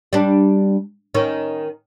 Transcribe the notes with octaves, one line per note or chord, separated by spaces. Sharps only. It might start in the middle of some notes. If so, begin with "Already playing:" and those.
G3 D4
D#3 C#4